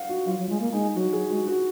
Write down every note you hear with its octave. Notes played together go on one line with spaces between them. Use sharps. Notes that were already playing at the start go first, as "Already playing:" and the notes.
Already playing: F5 F#5
F#4
F#3 F4
F#3
G#3 F4
A#3
G#3 D#4
F#3 F#4
F#3 G#4
G#3 F#4
F#4